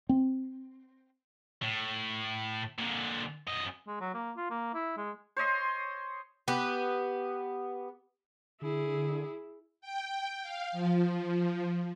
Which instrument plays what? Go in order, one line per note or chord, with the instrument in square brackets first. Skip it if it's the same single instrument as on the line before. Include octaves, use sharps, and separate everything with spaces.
[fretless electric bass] C4
[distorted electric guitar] A2
A#2 D3
F#2 D#5
[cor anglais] G#3
F#3
A#3
F4
A#3
E4
G#3
[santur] C5 C#5 D#5 C6
[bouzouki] B3 G4
[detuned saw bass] D3 [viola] E4 G#4
[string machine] G5
F5
F3